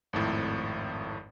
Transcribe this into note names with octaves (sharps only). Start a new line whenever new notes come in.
G#1 F2 A2